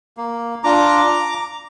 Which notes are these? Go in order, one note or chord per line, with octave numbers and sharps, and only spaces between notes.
A#3
D4 F4 A#5 D6